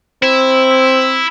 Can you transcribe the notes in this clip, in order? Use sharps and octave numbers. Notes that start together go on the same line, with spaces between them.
C4 E4